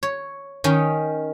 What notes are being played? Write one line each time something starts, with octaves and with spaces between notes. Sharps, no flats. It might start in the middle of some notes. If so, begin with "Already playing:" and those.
C#5
D#3 C#4 D#4